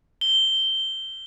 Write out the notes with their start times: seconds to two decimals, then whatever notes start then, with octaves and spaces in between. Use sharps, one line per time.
0.21 G7